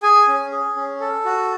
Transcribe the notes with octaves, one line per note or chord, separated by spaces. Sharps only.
G#4 G#5
C#4
G#4
C#4
A4
F#4